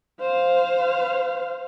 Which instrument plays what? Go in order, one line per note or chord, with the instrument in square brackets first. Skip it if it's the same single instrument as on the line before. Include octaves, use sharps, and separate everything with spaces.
[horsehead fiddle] C5 F5